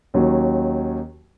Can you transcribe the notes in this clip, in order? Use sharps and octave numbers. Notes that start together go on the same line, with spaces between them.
D#2 D#3 F#3 C#4